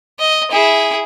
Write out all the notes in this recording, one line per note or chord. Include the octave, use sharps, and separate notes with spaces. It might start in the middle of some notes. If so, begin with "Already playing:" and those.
D#5
E4 G#4